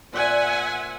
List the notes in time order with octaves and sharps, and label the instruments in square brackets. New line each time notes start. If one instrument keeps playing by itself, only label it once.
[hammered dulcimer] A#2 C5 D5 [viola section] E5 F#5 G#5